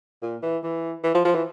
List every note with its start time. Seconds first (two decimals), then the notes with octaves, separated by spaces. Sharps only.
0.22 A#2
0.43 E3
0.64 E3
1.04 E3
1.15 F3
1.25 F3
1.35 E3